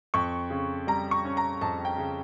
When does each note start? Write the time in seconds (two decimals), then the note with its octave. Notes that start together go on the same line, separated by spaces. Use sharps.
0.14 F2 C#6
0.50 C#3
0.87 G3 A#5
1.11 C#6
1.25 C#4
1.37 A#5
1.61 F2 A5
1.85 G5
1.98 C#3